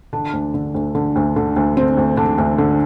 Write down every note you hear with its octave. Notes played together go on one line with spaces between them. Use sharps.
D3 D4
D2
D3
D2
D3
D2
D3
D2
D3 C4
D2
D3 D4
D2
D3